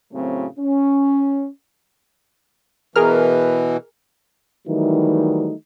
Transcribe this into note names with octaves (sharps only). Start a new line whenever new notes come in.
F#2 A2 C#3 F#3 A3 C4
C#4
B2 E3 G#4 A#4 F6
D#3 E3 F#3 G3 A3 D#4